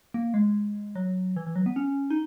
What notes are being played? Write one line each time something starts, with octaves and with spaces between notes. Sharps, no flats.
A#3
G#3
F#3
E3
E3
F#3
B3
C#4
D#4